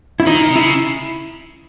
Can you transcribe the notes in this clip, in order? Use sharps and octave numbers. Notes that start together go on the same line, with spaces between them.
E4
D#3 D#4
C3
C#3 E4